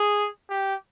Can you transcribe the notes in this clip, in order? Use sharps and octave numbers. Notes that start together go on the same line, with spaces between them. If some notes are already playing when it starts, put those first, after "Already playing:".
Already playing: G#4
G4